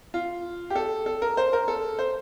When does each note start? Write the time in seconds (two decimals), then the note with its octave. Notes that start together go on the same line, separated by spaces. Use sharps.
0.14 F4
0.70 G4
0.75 A4
1.06 A4
1.22 A#4
1.37 C5
1.53 A#4
1.68 A4
1.99 C5